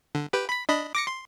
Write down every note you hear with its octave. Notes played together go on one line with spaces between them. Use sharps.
D3
G4 B4 G5
B5 B6
D4 D#5 B5
D6 A#6 C#7
C6